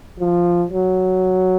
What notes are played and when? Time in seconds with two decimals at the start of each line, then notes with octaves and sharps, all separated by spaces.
0.20 F3
0.70 F#3